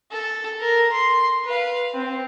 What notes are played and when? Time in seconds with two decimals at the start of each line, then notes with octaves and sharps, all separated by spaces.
0.11 A4
0.60 A#4
0.92 C6
1.44 B4 F5
1.93 C4